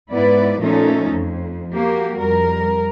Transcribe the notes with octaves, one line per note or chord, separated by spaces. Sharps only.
G#2 B3 E4 B4 D5
A#2 F3 A3 C#4 D#4 A4
F2
A#3 F#4 G4
F2 G3 A#4